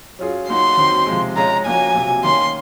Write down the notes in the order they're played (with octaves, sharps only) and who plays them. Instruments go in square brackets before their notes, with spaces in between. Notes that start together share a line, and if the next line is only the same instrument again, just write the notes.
[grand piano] F#3 C#4 F4 G#4
[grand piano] F#3 A#3 D#4 F#4 [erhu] C6
[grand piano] D#3 F#3 C4 D#4
C3 F3 G#3
[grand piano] C#3 G#3 C#4 [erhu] A#5
[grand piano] F3 A#3 C#4 F#4 [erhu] G#5
[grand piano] C3 F#3 A#3
[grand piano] D#3 A#3 C#4 [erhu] C6